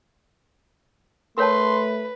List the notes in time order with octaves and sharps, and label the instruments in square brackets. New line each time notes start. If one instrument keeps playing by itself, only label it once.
[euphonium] A3 [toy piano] A#4 C#5 A5 [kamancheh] B4 [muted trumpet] C6